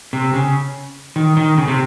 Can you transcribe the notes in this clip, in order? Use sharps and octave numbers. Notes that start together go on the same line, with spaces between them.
C3
C#3
D#3
D#3
C#3
C3